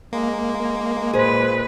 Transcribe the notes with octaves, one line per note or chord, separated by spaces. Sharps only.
G#3 A#3
A#2 G#4 B4 C5